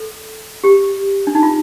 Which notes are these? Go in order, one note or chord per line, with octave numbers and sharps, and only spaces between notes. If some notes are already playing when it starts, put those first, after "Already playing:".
Already playing: A4
G4
D4
D#4
F4